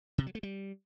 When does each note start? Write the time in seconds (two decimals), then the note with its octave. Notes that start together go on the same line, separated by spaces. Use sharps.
0.18 C3
0.26 F#3
0.35 A3
0.43 G3